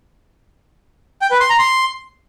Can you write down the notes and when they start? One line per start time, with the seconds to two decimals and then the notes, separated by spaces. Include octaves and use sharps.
1.21 G5
1.31 B4
1.40 C6
1.50 A#5
1.59 C6